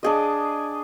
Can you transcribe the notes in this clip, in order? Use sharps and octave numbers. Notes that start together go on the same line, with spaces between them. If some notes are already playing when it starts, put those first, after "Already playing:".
D4 G#4 D#5